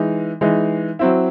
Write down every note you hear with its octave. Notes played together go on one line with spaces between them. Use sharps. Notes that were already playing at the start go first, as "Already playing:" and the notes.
Already playing: E3 G#3 D#4
E3 G#3 D#4
F#3 C4 E4